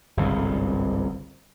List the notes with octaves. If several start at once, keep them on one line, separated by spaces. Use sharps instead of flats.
G1 C2 G#2 C#3